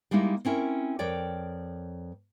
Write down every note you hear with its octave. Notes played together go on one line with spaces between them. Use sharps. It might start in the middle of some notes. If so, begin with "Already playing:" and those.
G3 G#3 A#3 D#4 E4
C4 C#4 E4 A#4
F2 A#4 C#5 D5 G5